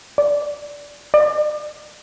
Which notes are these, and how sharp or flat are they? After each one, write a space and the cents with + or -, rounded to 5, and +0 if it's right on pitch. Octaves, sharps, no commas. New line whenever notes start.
D5 -5
D5 +40